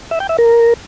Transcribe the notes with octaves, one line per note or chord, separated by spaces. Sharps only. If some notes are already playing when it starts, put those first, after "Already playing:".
E5
G5
E5
A#4